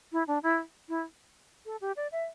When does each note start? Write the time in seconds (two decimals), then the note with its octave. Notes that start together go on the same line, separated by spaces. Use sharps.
0.12 E4
0.28 D4
0.43 E4
0.89 E4
1.66 A4
1.81 G4
1.97 D5
2.12 E5